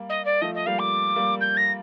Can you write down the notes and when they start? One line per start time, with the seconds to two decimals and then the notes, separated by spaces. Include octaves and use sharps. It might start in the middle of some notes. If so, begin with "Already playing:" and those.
Already playing: G3 A#3
0.09 D#5
0.25 D5
0.41 F3 A3 D#5
0.55 D#5
0.66 G3 A#3 F5
0.79 D6
1.16 G3 A#3
1.41 G6
1.57 A#6